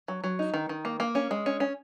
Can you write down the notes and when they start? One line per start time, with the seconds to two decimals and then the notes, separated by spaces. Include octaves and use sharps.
0.08 F#3
0.24 F#3
0.39 D#4
0.54 D#3
0.69 D#3
0.85 A#3
1.00 A#3
1.15 C#4
1.31 G#3
1.46 C#4
1.60 C#4